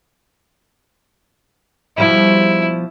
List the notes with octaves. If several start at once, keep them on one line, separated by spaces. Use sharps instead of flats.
B2 F3 G3 E4